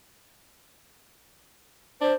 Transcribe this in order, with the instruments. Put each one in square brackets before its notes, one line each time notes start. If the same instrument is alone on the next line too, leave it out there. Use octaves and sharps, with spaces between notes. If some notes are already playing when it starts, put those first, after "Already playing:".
[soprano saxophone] D4 [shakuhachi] C5